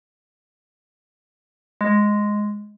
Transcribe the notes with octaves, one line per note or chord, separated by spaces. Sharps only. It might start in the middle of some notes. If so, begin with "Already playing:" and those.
G#3